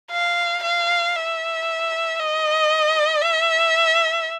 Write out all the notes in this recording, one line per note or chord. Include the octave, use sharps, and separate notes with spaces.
F5
F5
E5
D#5
E5